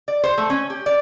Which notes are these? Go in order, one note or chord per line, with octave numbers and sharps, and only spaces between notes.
D5
C5
A3
C#4
G4
D5